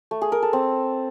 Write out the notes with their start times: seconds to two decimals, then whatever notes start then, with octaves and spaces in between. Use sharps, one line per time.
0.11 A3
0.22 G#4
0.32 A#4
0.42 A4
0.53 C4